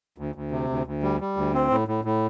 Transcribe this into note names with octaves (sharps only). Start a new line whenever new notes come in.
D2
D2
C3
D2
D2
G3
G3
D2
C4
A2
A2
A2